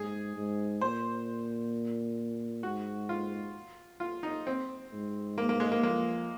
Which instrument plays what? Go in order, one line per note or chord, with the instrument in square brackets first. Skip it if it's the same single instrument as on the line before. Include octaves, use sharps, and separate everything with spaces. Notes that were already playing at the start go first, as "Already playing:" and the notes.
Already playing: [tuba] G#2 [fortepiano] G#4
[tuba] G#2
[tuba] A#2 [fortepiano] C5
[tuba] G#2 [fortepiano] F#4
[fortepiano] F4
F4
D#4
C4
[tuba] G#2
[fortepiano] A#3
A#3
G#3
A#3
[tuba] F3 [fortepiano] A#3